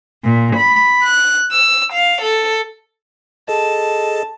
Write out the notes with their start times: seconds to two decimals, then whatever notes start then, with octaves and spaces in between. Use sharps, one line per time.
0.24 A#2
0.57 B5
1.03 F#6
1.52 E6
1.92 F5
2.21 A4
3.48 G#4 A4 D#5 A5